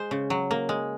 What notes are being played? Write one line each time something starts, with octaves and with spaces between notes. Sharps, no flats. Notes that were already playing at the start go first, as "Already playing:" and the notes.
Already playing: G#3 C5
C#3
F#3
A#3
G#3